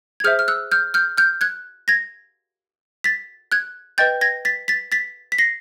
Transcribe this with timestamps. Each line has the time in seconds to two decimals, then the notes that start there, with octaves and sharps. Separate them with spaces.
0.20 G#6
0.24 G#4 C5 E5 F6 G6
0.39 F6
0.48 E6 F#6
0.71 F6 G6
0.94 F6 G6
1.17 F6 G6
1.41 F#6 G#6
1.88 G#6 A#6
3.04 A6 B6
3.52 F#6 G#6
3.98 B4 D#5 G5 G6 A6
4.21 G#6 A#6
4.45 A6 B6
4.68 A6 B6
4.92 A6 B6
5.32 B6
5.38 A#6 C7